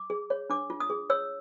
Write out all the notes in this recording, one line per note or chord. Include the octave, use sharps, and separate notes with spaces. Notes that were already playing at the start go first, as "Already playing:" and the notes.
Already playing: D6
G#4
C#5
D4 D6
F4
D#6
G#4
C#5 E6